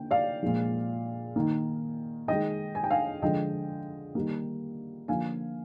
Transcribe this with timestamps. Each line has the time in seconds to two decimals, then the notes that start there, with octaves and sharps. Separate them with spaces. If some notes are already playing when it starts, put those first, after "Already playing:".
Already playing: D3 A#3 G5
0.11 D5 F5
0.43 A#2 F3 G#3
1.36 D#3 A#3
2.28 D#3 G#3 D#5 G5
2.75 G#5
2.84 G5
2.91 F5 G#5
3.22 D3 F3 G#3 D#5 G5
4.15 D#3 G3 A#3
5.08 D3 F3 A#3 F5 G#5